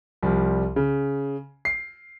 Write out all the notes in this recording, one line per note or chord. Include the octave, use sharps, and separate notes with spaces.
C2 F3 G3
C#3
C7